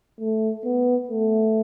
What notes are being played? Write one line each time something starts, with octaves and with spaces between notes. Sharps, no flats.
A3
B3
A3